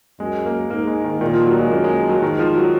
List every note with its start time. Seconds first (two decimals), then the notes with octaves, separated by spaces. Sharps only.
0.20 F#2 G#3
0.46 A#3
0.70 G#2 A#3
0.87 G#3
1.04 D#3
1.21 A#2 D#3
1.34 F3
1.46 F#3
1.59 G#3
1.71 F#2 A#3
1.84 G#3
2.09 F#3
2.22 G#2 D#3
2.39 F3
2.56 F#3